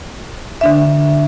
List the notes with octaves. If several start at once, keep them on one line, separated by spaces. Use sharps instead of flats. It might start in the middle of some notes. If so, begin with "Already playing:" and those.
D3 D4 E5